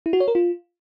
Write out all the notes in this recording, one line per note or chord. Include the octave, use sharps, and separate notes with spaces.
E4
F#4
C#5
A#4
F4